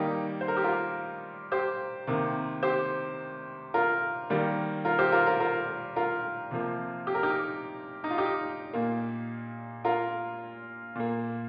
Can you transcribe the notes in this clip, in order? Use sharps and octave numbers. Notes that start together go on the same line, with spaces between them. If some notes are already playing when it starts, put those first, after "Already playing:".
Already playing: D#3 G3 A#3 D#4 G4
C5
A#4
G4
F4 A#4
G4 C5
C3 D#3 A#3
G4 C5
F4 A#4
D#3 G3 A#3
F4 A#4
G4 C5
F4 A#4
F4 A#4
F4 A#4
F4 A#4
C3 F3 A#3
G4
A#4
D#4 G4
D#4
F4
D#4 G4
A#2 A#3
F4 A#4
A#2 A#3